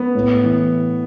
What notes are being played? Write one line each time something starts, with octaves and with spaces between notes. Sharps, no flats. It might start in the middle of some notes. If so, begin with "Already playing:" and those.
Already playing: B3
A2
E3